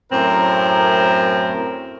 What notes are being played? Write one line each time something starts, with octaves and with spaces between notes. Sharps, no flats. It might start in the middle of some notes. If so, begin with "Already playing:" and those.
F#2 A2 C4 A#4